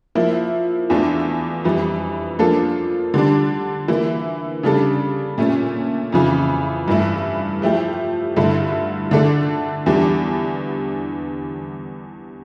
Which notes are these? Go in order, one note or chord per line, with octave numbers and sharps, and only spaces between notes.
F3 A#3 E4
E2 E3 A3 D4 F4
F2 E3 G3
F3 A#3 D4 F4 A4
D3 G3 D4
E3 A#3 E4
C#3 G3 D4 A4
A#2 A3 C#4
F2 C#3 E3
G2 E3 A3 E4
F3 A3 E4 G4
G2 D3 A3 E4 A4
D3 A3 D4 A4
E2 E3 G3 D4